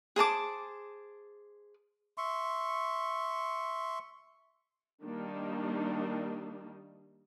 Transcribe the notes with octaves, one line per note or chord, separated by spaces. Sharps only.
G#4 C5 A5 D6
E5 C6 C#6
D#3 G3 A#3 D4 D#4